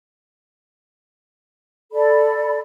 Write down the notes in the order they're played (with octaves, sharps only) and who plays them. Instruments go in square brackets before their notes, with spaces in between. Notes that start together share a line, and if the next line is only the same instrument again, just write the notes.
[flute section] A4 D5 B5